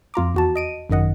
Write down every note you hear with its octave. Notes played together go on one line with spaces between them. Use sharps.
F2 F4 A#5 D6
E2 F#4 A5
D#5 D7 D#7
G#1 F#2 D#3 D#5 F#5